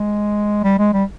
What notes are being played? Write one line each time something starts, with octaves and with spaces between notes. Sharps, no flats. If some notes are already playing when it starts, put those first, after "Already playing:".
Already playing: G#3
G3
G#3
G3